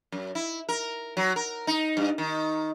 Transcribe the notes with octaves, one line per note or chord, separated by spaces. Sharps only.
F#2
E4
A#4
F#3
A#4
D#4
G2
D#3